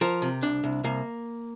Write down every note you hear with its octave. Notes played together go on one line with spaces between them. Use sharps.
F3 A#4
C3
C2 D4
C2
C2 A#3